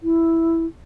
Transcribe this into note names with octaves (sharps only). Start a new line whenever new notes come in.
E4